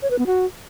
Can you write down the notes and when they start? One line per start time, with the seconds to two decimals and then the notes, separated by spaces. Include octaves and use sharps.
0.03 C#5
0.11 B4
0.19 B3
0.27 F#4